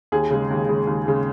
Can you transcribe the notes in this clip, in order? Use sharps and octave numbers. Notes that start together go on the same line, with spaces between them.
D#2 G#4
C#3 G#3
D#2
C#3 G#3
D#2
C#3 G#3